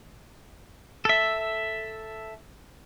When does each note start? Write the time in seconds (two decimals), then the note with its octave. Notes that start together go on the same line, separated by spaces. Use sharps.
1.05 A4 E5